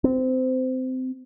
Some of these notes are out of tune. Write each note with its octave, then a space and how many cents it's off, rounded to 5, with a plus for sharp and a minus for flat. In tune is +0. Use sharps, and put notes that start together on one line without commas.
C4 -20